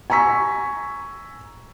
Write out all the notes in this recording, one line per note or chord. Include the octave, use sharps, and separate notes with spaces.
G#5 A#5 C#6 E6 B6